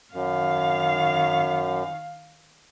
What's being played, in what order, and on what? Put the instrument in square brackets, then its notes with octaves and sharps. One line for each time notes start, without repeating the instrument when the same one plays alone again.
[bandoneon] F#2 [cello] D#3 F5